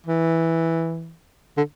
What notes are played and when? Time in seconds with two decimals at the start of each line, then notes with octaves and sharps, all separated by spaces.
0.06 E3
1.57 D3